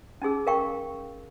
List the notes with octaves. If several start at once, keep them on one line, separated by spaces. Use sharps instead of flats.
C#4 D#4 G#4 E6
A#4 F5 G5 C#6